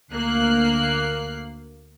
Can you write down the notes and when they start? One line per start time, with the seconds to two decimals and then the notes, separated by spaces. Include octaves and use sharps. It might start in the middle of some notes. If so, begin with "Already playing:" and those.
0.12 D2 A#3 F#6 C7